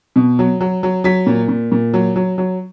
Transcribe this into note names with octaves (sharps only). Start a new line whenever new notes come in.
B2
F#3
F#3
F#3
F#3 B6
A#2
A#2
A#2
F#3
F#3
F#3